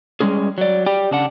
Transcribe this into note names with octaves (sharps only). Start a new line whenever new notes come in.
G3 G#3 C#4 G#4
F#3 D5
G4 D5 G5
C#3 D4 F#5